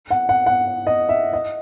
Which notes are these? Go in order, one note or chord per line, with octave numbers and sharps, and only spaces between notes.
F#5
F#5
F#5
D#5
E5
D#5